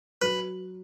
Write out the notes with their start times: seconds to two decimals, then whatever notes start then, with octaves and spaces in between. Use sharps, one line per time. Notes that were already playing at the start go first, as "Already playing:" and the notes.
0.22 F#3 B4